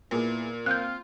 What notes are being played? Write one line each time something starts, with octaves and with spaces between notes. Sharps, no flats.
A#2 B3 E4 G#4
C4 F4 F#6 G6